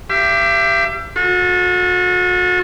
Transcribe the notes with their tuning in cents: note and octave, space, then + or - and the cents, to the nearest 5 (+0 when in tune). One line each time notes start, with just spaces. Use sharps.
G4 +0 E5 +45
F#4 -40 A4 +0